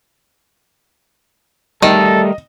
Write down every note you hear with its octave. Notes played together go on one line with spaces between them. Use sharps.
D#3 G3 A3 A4 D#5